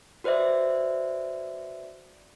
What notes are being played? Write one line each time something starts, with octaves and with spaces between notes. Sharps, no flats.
F#4 B4 C5 D5 E5